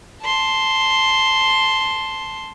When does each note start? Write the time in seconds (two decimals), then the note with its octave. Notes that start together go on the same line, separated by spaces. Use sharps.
0.22 A5 C6